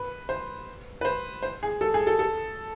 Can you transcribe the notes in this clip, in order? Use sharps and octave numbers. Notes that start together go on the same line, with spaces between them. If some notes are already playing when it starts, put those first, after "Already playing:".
Already playing: B4
C5
B4
C5
C5
G#4
A4
G#4
A4
A4